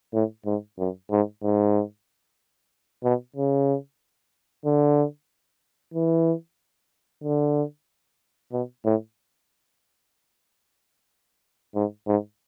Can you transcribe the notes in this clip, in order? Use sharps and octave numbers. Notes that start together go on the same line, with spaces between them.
A2
G#2
F#2
G#2
G#2
B2
C#3
D3
E3
D3
B2
A2
G#2
G#2